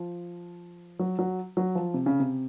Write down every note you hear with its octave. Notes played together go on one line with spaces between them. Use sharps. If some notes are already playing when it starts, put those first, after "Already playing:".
Already playing: F3
F#3
F#3
F#3
F3
C3
C#3
C3